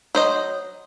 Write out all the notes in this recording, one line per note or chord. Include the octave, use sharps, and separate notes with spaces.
F#3 C5 D#5